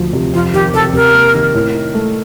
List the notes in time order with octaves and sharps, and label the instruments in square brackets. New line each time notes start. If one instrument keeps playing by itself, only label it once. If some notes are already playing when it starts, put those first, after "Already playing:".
Already playing: [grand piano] D2 F3
C3
[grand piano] F2 [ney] F4
[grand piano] D#3 [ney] G4
[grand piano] C3 [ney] A4
[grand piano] C3 [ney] A#4
[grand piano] A#3
D#3
A2
D#4
A3